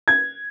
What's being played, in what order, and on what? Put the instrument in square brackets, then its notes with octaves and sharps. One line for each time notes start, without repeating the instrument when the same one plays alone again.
[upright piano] G#6